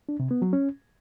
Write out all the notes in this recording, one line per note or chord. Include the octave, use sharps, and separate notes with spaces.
D4
C3
B3
F#3
C#4